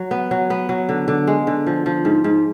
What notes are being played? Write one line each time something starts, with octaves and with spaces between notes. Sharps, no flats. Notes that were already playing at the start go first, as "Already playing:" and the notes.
Already playing: F#3
B3
F#3
B3
F#3
D3
D3
G#3
D3
F3
F3
G#2
G#2